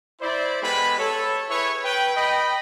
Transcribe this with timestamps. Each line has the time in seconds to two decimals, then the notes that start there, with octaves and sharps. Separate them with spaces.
0.21 E4 C5 D5
0.62 G#3 B3 G4 A4 B4 B5
0.98 A4 C#5
1.49 E4 G#4 B4 C#5
1.85 B4 G5
2.15 D#5 G5 B5